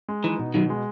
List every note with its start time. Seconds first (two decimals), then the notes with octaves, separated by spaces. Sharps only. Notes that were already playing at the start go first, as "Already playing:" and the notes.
0.09 G#3
0.24 E3 D#4
0.39 B2
0.54 B2 D#3 F#3
0.70 G#3